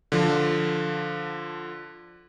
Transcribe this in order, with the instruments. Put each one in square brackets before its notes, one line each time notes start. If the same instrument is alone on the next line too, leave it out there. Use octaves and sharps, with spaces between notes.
[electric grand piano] D3 F3